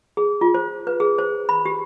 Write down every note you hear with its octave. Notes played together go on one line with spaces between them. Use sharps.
G#4
F4
C5
B4
G#4
C5
B5
G4